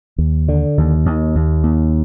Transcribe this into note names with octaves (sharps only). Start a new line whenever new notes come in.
D#2
D3
D#2
D#2
D#2
D#2